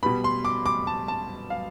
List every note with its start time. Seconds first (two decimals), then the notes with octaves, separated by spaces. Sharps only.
0.03 B2 G3 B3 B5
0.24 C6
0.45 D6
0.66 D6
0.87 A5
1.08 A5
1.50 F5